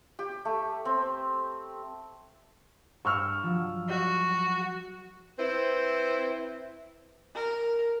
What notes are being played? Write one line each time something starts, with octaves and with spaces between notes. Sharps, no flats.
G4
A3
C4
G2 C#6 E6 F6
F3 F#3
F#4
C4 E4 B4 C5
A#4